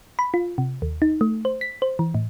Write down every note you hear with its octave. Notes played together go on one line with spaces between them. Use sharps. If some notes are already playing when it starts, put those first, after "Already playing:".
B5
F4
C3
D#2
D#4
A3
C5
B6
C5
E3
A2